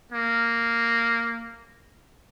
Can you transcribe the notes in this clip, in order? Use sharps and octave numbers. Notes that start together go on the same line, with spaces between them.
A#3